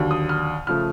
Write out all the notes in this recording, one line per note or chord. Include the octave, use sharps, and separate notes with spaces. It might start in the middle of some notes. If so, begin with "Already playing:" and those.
Already playing: D#2 D3 F#3
D#6
F6
C#3 F3 A3 F6